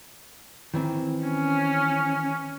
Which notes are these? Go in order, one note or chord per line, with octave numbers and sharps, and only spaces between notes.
D#3 E3 C4
C#4